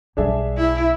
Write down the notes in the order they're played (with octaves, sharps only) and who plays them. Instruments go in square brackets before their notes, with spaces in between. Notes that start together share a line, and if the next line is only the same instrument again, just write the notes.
[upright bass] B1 G3 [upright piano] D4 G#4 E5
[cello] E4